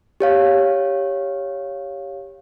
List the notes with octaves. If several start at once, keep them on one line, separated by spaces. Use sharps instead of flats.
G4 C#5 F5